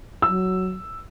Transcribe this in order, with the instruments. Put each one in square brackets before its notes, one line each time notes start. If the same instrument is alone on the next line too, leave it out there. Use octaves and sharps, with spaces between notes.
[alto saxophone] F#3 [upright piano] E6